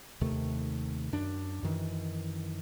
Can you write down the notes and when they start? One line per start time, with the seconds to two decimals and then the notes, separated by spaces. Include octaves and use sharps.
0.21 D#2 C3 D#3 A3
1.12 F#2 D4
1.63 F#2 D#3 E3